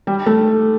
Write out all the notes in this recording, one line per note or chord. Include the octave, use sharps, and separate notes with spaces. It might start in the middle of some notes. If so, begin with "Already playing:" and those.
G3
A3